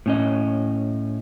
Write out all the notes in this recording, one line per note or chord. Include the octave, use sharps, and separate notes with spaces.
A2 C#4 D#5